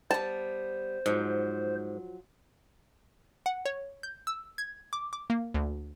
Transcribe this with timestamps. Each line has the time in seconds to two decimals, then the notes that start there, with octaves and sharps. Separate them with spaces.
0.11 G3 B3 C5 A5
1.06 G#2 F3 F#3
3.46 F#5
3.66 C#5
4.03 G6
4.27 E6
4.58 G#6
4.93 D6
5.13 D6
5.30 A#3
5.54 D2